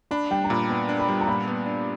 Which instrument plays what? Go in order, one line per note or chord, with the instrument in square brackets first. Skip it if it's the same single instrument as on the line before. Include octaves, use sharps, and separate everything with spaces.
[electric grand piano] D4 [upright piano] B5
[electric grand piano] G3 [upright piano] G5
[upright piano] A#5
[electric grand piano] A#2 [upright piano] B5
[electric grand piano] B3 [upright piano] B5
[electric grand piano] D4
[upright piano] B5
[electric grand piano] G3
[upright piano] A#5
[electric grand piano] A#2 [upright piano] B5
[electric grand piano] B3
D4